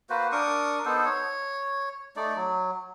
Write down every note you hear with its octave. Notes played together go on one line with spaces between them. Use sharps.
A#3 F#4 B4 C5
D4 A#4 C#6 D#6
B3 D#4 A4 C5
C#5
A3 D#4 D5
F#3